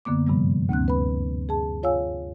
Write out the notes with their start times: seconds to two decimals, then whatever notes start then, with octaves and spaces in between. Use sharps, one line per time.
0.05 F#2 D3 A#3 B3 D6
0.27 G2 C3 F3 G3
0.69 D2 A#3 C4 F#6
0.88 B4 B5
1.49 G#4 A5
1.83 F4 C#5 F5 G#5 E6